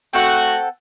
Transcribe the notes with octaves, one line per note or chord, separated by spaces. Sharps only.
A3 C4 F#4 A4 F#5